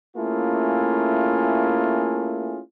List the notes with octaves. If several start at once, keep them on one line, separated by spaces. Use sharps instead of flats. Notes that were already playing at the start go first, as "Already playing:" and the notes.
A3 A#3 C#4 E4 F4 G#4